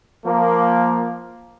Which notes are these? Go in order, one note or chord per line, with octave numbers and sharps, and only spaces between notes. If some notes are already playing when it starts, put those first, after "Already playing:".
F3 A#3